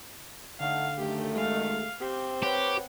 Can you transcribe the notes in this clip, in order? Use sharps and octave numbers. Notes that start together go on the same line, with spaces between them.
D3 A3 D#4 F5 F#5
F#2 D#3 A3 G4
G#3 F5
C4 G4
G4 B4 C#5 F#5